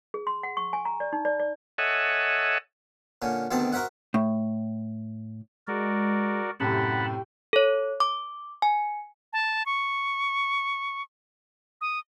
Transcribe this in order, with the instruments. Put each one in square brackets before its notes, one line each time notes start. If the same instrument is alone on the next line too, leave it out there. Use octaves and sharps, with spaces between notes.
[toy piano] G#4
C6
F#5
C#6
G#5
A#5
D5
D#4
D5
D5
[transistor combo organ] A4 C#5 D#5 E5 F#5 G#5
[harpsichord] A#2 D3 C#4
D2 B2 D#3 C4 C5 A5
F#4 A#4 C5 E5 F#5
[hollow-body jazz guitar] A2
[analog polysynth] G#3 [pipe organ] F#4 A#4 D5
[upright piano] F#2 A2 C3 [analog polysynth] G4 G5 [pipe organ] F#5 A5 B5
[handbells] A4 C#5
D6
G#5
[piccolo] A5
C#6
D#6